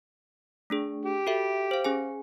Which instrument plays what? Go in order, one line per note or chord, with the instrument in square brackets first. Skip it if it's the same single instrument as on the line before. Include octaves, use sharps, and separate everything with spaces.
[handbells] A3 D4 G#4
[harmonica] G4
[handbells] F#4 A4 E5
C5 F5
C#4 G#4 G#5